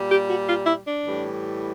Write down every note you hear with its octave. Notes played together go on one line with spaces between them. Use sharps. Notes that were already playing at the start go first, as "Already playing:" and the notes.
Already playing: A#2 G3
G4
F#4
F4
E4
D4
A2 E3 G3